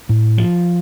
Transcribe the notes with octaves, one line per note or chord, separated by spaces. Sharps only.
A2
F3